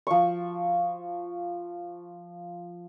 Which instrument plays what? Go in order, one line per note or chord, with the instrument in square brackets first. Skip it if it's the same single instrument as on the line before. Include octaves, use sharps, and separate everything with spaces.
[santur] F3 C#6